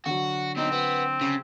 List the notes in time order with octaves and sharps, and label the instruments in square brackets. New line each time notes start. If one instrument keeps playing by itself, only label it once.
[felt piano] D3 F#3 [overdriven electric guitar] F#4
[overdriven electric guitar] B2 D#4 [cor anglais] C4
[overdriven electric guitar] B3
C#3